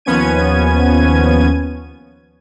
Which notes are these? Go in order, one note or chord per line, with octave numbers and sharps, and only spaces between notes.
D#2 F3 B3 C#4 G#6 D#7